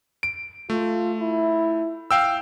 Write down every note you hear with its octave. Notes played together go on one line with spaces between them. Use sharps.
D7
A3 F4
E4
F5 G5 E6